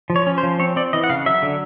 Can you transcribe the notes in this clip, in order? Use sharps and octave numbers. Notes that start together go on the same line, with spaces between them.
F3
C#5
C#4
C5
F3
C4 C#5
C4 D5
E3 D#5
F#5
C#3 F5
F#3 E5
D3